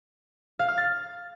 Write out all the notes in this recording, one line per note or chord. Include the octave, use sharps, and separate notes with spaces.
F5
F6
A6